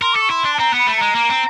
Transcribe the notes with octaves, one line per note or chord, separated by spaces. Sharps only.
A#4 C6
A4 D6
C#6
E4 C6
D4
A5
C4 A#5
B3 B5
A3
G#3 A#5
A#3
C4